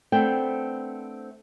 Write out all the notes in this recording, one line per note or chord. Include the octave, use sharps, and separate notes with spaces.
A3 B3 C4 D4 G5